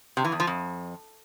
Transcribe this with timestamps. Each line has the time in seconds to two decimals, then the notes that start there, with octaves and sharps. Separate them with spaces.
0.17 C3
0.24 E3
0.32 E2
0.40 F3
0.47 F2